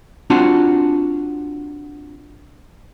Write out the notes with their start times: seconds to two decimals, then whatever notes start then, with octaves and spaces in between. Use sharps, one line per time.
0.30 C4 D4 F4 F#4 G#5 A5